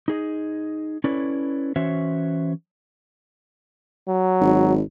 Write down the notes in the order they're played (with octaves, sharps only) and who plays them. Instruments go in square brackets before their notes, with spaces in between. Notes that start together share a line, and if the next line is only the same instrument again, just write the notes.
[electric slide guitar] D#4 G#4 D#5
C#4 E4 A4 B4 C#5 D5
E3 C#4 F#4 C5 C#5 E5
[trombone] F#3
[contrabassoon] G#1